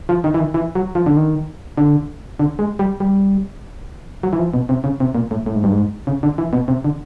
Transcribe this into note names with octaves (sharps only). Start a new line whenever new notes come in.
F3
D#3
E3
D#3
E3
F#3
F3
D3
D#3
D3
D3
G#3
G3
G3
F#3
E3
F3
B2
C3
C#3
C3
A#2
A2
A2
G#2
G2
G#2
C#3
D3
E3
B2
C3
D3